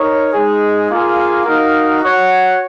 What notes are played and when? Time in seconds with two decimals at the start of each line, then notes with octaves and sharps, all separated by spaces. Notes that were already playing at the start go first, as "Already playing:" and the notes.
Already playing: D#4 A#4 C#5
0.33 G#3 D#4 G#4
0.89 A#3 F4 G#4
1.45 D#4 F#4 A#4 F5
2.01 F#4 C#5 F#5